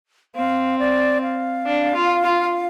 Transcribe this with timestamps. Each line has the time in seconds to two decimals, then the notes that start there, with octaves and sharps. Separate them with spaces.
0.35 C4 F5
0.79 D5
1.22 F5
1.66 D4
1.95 F4
2.24 F4